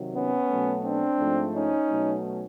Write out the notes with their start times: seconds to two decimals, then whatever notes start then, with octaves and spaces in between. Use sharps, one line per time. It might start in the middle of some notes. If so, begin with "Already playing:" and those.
Already playing: C3 D#3 F#3
0.13 B3 C#4
0.49 B2 F#3 A3
0.84 C4 D4
1.18 G#2 F3 A3
1.53 C#4 D#4
1.89 B2 F#3 A3